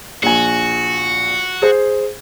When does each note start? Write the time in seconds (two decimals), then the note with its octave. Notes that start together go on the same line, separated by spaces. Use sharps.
0.23 A#1 F#4 G#5
1.62 G#4 C5